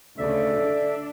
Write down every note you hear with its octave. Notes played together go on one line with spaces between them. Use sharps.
D2 C#3 A4 D5 E5
D4